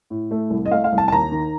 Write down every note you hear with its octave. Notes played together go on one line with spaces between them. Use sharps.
A2
A3
C2
D#5
A3 F5
F5
C2
A5
A5
D#2 A#5
D#3